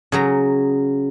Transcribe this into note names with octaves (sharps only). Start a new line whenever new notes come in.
C#3 F#3 A#5